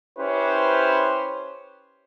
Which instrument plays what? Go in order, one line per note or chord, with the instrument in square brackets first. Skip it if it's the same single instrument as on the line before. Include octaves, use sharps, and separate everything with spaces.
[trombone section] C#4 E4 G4 B4 C5